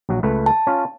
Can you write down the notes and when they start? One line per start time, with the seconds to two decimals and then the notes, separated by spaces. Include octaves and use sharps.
0.09 A#1 F#3 F#4
0.23 C#2 A3 B4
0.46 A5
0.67 C#4 F4